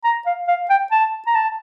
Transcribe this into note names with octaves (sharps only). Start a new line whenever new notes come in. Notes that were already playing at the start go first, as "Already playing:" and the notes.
A#5
F5
F5
G5
A5
A#5
A5